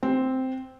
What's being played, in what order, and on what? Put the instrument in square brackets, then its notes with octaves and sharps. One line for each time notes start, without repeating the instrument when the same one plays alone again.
[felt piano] C4